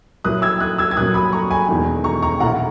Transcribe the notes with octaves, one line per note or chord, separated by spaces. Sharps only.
A#2 F#3 A#3 E4 D#6 F#6
E6 G#6
D#6 F#6
E6 G#6
G#6
A#2 F#3 A#3 D#6 F#6
B5 D#6
A#5 C#6
G#5 B5
E1 E2 D#3
A#5 C#6
A#5 C#6
B1 A#2 A#3 E4 F#5 A#5